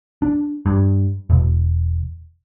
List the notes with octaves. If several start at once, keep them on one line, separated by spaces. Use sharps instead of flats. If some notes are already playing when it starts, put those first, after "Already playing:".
D4
G2
E1 B2